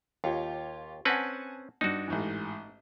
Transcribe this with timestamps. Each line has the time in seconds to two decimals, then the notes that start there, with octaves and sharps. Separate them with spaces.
0.24 D#2 F4 G4 C#5
1.05 C4 C#4 B4 F#5 G#5 A5
1.81 G2 D4 D#4 F#4
2.08 A1 G#2 E3